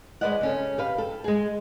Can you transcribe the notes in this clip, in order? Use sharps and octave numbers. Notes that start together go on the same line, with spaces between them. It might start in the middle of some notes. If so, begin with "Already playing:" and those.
G#3 B4 C5 D5 D#5 F#5
C#3 C#4 A4
G4 B4 F5
A4
G#3 G#4